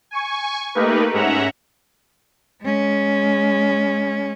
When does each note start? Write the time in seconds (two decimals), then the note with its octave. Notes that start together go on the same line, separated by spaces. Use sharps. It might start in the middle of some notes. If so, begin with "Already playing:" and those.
0.11 G#5 C#6
0.75 A3 A#3 D#4 G4 A#4 B4
1.14 G#2 C#4 E5 F#5 A#5
2.62 G#3 C#4